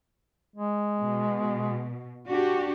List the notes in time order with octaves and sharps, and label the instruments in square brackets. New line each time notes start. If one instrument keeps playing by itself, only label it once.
[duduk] G#3
[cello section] B2
D4 F#4 G4